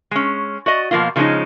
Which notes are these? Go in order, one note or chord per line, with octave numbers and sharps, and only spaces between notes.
G#3 C#4
F#4 D5 D#5
B2 F3 A#3 B3 F4
C#3 F3 G#3 C4 C#4 D#4